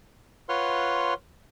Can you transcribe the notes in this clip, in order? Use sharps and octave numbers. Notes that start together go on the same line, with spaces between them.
F4 B4 C#5 F#5 C6 F6